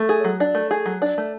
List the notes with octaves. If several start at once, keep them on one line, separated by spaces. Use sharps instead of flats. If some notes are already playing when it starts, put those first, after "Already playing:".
Already playing: A3
G#4
F#3
D4
A3
G#4
F#3
D4
A3